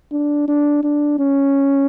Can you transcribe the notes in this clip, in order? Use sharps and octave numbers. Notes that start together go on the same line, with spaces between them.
D4
D4
D4
C#4